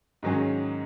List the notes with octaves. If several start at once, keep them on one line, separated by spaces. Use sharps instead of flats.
G#2 D#3 F#3 C#4 G#4